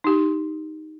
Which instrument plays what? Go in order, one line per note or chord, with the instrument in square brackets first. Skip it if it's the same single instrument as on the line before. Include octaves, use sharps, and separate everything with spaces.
[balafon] D#4 G4